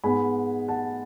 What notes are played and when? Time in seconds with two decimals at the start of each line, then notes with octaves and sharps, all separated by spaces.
0.04 G#2 G#3 B3 G#5 B5
0.68 F#5 A5